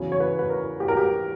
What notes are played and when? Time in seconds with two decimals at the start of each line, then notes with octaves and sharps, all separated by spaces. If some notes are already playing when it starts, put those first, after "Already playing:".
Already playing: E2 C#3 F#3
0.12 C#5
0.20 B4
0.39 B4
0.50 A#4
0.80 G4
0.88 A#4
0.97 G4